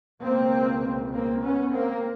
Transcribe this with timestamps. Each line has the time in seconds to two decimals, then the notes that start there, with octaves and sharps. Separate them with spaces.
0.22 C#2 B2 A#3 C4
1.12 A#3 C4
1.42 B3 C#4
1.72 A#3 C4